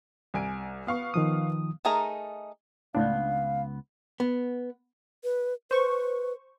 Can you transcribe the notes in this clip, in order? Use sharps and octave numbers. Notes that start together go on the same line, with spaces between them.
C2 G#5 D7
B3 F5 C#6
D#3 F3 D#6
A3 D#4 G#4 A#4 A#5
C#2 A2 B3 D4 F5
B3
B4
B4 C5 C#6